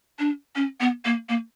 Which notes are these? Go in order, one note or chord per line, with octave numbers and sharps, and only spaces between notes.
D4
C#4
B3
A#3
A#3